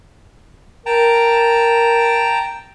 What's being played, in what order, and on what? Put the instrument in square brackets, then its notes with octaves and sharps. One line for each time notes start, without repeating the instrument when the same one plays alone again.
[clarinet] A#4 [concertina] G5 A5 A#5